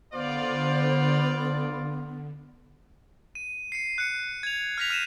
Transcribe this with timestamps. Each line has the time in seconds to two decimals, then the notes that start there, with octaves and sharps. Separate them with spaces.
0.13 D3 B3 F4 C5 D5
3.35 D#7
3.72 C7 C#7 D#7
3.98 F#6 C#7
4.43 G#6 F7
4.78 F6 G6 A#6 B6 F7
4.90 F6 D#7 E7